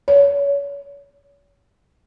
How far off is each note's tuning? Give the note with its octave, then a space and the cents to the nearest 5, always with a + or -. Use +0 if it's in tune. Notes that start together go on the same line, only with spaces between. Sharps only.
C#5 +30